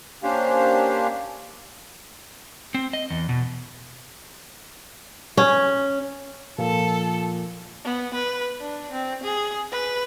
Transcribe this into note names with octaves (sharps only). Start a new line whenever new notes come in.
A#3 C#4 D4 G4 C5 F5
C4
D#5
E2
B2
C#4
A#2 F3 A4
B3
B4
D4
C4
G#4
B4